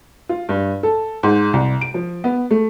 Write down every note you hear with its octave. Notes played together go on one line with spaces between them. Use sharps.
F4
G2
A4
G#2
C2
D7
F3
B3
A3